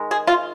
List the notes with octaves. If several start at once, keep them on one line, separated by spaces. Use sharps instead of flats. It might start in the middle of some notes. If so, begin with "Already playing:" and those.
Already playing: D#3 G#3
G#4
F4